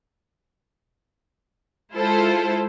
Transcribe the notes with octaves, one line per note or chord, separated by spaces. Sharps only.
G#3 E4 F4 A4 C5